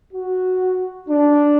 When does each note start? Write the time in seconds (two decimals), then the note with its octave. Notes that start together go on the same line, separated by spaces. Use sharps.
0.13 F#4
1.09 D4